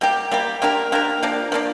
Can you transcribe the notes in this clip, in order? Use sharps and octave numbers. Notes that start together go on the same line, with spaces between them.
G3 A#3 G4
G3 A#3 G4
A#3 D4 G4 A#4
A#3 D4 G4 A#4
F3 A#3 D4
F3 A#3 D4